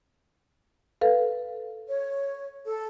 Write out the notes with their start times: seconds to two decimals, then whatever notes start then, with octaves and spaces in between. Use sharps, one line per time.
1.01 A4 B4 F5
1.88 C#5
2.65 A4